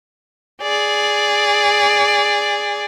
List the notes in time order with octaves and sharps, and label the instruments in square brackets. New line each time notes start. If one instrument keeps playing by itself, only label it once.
[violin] G#4 D5